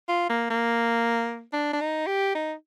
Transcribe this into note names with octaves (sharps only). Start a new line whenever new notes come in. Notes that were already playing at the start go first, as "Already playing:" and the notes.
F4
A#3
A#3
D4
D4
D#4
G4
D#4